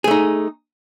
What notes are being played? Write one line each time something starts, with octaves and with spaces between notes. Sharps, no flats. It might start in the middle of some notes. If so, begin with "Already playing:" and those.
A3 D#4 G#4